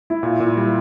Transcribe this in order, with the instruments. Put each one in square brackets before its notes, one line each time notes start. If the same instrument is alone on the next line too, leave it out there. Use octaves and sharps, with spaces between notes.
[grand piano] E4
[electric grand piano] A#2 [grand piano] F4
[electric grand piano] A#2
[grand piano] E4
[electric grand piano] G3